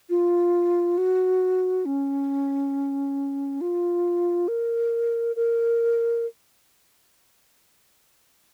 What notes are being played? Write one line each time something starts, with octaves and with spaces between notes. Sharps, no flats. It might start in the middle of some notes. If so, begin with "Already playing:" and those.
F4
F#4
C#4
F4
A#4
A#4